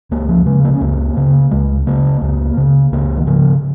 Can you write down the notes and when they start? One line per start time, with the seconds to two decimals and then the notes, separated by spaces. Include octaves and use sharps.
0.11 C#2 A#3
0.29 F3
0.46 C#3 G#3
0.65 A#3
0.74 C#4
0.81 C#2 A#3
1.17 C#3
1.51 C#2 G#3
1.87 C#3 A#3
2.22 C#2
2.57 C#3
2.92 C#2 A#3
3.17 D#3
3.27 C#3 F3